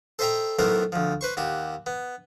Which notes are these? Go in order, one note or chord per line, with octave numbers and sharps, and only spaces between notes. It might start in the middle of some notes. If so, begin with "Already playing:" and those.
A4 C5 D#5 E5 G5 A#5
B1 A2 A3 B3 A#4 C5
D2 F3
B4 C5 C#6
D#2 F#4 G4
B3